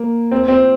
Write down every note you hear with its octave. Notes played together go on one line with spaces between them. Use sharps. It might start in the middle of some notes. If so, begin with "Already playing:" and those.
Already playing: A#3
C4
C4